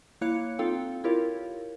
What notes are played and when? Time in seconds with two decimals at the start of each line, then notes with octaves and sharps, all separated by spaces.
0.21 A#3 E4 C#5 F5 F#6 C#7
0.59 C4 D#4 F4 A4 F5 G5
1.04 E4 F4 G4 A#4 C#5 F5